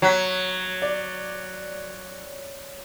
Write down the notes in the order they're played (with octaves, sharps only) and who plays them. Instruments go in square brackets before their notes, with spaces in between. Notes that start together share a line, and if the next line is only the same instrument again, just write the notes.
[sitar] F#3 [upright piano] A#5 B6
[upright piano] D5